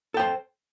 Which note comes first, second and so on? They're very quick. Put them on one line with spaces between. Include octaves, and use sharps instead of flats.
A4 G5 C5